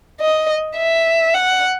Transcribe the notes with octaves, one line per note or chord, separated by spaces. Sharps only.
D#5
E5
F#5